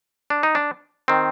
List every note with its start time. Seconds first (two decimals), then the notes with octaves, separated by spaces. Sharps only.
0.30 D4
0.43 D#4
0.55 D4
1.08 D#3 C4